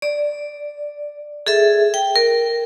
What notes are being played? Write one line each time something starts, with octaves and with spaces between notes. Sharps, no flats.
D5
G#4 A4 E5
G5
A#4